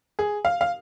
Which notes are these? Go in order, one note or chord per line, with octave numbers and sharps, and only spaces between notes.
G#4
F5
F5